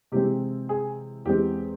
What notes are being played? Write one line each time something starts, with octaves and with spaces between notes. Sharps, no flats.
C3 E3 G#3 C4 G4
G#4
E2 E3 G#3 C4 G4